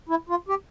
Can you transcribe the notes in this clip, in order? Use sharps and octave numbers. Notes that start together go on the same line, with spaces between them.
E4
F4
G4